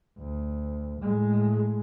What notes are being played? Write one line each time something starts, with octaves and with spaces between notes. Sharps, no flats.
D2
A2 G#3